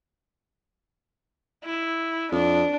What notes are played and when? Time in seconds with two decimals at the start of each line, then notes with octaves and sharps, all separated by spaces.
1.64 E4
2.32 F2 D4